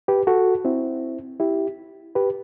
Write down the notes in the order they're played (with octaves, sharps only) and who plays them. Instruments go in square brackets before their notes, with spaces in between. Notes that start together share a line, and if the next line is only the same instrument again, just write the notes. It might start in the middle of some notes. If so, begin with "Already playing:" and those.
[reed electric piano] G4 B4
F#4 A4
C4 E4
E4 G4
G4 B4